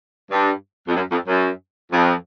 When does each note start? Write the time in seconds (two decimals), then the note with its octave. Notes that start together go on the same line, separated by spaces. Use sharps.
0.30 G2
0.88 F2
0.95 F#2
1.11 F2
1.27 F#2
1.93 F2